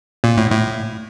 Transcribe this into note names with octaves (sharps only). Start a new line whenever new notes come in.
A#2
A2
A2